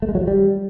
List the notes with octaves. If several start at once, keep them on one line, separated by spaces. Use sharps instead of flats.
A3
G#3
F#3
F3
G3